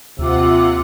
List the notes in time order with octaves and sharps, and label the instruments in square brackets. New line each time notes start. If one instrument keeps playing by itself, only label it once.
[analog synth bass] D#2 [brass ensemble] C3 C4 [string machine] F4 F#5 [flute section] E5 D6 E6